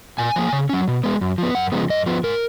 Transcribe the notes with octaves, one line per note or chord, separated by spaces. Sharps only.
A#2 G#5
F3 A#3
C#3
F#3 C#4
B2
G#3 B3
F#2
F3 B3
F#2 F#5
C#3 F3 G#3 B3
F#2 D#5
F3 B3
G#2 A#4